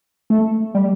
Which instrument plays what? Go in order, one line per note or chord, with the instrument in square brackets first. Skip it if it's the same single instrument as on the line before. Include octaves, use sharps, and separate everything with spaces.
[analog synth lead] A3
G3